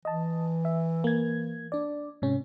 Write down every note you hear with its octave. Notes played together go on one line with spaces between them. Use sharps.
E3 D#5 A5
E5
A#3 G#6
D4 D5
G#2 C3 C#4